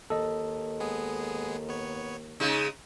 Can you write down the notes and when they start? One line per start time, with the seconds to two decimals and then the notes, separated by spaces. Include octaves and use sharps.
0.10 D#2 A4 D#5
0.80 G#3 B3 G#4
1.69 B3 C#5
2.40 C#3 G#3 D#4 C#6 D#6